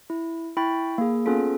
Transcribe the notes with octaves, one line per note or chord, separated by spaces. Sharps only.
E4
E4 G5 B5 C#6 A6
A#3 G#4
B3 C#4 F4 G#4 A4